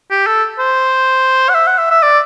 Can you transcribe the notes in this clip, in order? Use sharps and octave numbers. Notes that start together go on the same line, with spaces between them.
G4
A4
C5
F#5
E5
F#5
E5
E5
D5